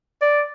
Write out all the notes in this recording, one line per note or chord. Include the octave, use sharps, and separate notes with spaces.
D5